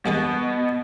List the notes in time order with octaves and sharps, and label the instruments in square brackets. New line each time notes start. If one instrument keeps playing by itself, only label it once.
[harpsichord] G2 G#3 B4 [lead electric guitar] B2